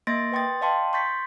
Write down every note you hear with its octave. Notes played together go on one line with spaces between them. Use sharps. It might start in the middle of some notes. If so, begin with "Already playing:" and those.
A#3 D#5 C6 A6 A#6 D7
B4 D5 G5 C6 D#6 A6
D5 D#5 F5 G5 A5 C6
C6 C#6 G6 A6 B6